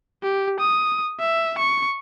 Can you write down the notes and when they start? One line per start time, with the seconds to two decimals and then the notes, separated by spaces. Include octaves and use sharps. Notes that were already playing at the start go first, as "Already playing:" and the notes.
0.23 G4
0.60 D#6
1.20 E5
1.59 C#6